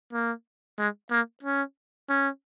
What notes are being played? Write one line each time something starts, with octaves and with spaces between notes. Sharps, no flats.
A#3
G#3
A#3
C#4
C#4